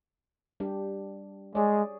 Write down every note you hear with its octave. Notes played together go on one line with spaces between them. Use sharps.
G3 D4 G4
G#3 G#4 C#5 D5